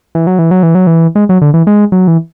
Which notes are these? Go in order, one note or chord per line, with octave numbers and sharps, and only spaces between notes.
E3
F#3
E3
F#3
E3
F#3
E3
G#3
F#3
D3
E3
G#3
F#3
E3